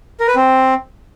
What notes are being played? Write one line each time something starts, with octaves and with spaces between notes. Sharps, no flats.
A#4
B4
C4